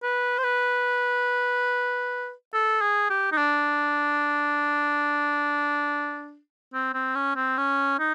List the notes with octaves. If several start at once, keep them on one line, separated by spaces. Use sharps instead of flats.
B4
C5
B4
A4
G#4
G4
D#4
D4
C4
C4
C#4
C4
C#4
D#4